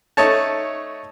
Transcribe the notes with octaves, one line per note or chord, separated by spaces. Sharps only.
A3 D#4 C#5 A5